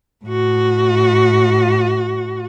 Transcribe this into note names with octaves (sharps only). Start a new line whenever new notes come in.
A2 F#4